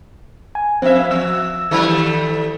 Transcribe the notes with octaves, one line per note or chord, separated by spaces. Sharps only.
G#5
F2 C4 E5
F3 E6
D#3 G3 A3